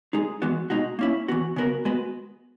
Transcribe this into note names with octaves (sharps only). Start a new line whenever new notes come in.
G#3 D#4 G#4
E3 G#3 B3 F#4
B2 G#3 D#4 F#4
A#3 C#4 E4
E3 B3 F#4
C#3 F#3 B3 F#4 A#4
G#3 B3 F#4 B4